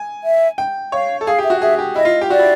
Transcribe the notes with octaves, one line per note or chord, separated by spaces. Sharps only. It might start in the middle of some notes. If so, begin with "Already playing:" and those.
Already playing: G#5
E5
G5
C#5 F5
A4
G#4 F5
G4
E5
F#4
G#4 E5
G4
E4 D#5
F4
G4
F#4 D5
E4